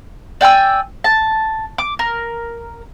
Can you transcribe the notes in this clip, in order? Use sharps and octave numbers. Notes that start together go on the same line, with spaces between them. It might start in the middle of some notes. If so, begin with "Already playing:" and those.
D5 G5 G#5 E6
A5
D6
A#4